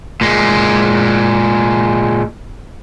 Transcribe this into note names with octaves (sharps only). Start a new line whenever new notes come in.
A#2 G#3